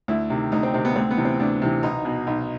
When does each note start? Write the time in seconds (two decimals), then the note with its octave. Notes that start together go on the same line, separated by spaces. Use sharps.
0.08 D2 E4
0.30 C3 D#3
0.52 D2 D#4
0.63 C4
0.74 C3 D#3 C4
0.85 B3
0.96 D2 C4
1.11 B3
1.17 C3 E3
1.25 C4
1.40 D2 D4
1.62 C3 E3
1.83 B1 D#4
2.05 B2
2.27 B1